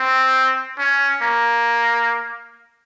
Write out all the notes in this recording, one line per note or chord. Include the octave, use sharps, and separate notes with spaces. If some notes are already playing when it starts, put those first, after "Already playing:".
Already playing: C4
C#4
A#3